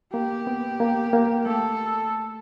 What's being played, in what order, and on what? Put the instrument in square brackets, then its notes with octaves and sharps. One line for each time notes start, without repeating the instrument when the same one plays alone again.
[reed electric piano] A#3 [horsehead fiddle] G4
[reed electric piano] B3
A#3
A#3
[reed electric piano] A3 [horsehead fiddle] A4